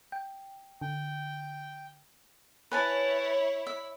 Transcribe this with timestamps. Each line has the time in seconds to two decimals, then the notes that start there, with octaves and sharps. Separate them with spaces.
0.12 G5
0.81 D3 G5
2.72 E4 B4 C#5 G#5 A5
3.67 E5